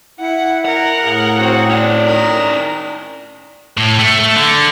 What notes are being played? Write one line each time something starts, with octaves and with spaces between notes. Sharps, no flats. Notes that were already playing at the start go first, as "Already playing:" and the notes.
E4 F#5
A#4 F#5
A2 G#4 F5
C4 F#4
C#4 D5
D#3 A#4 A#5
A2
A3
D3